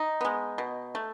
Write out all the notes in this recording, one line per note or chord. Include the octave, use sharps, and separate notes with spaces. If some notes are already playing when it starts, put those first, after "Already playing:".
Already playing: D#4
G#3 B3
B2
A3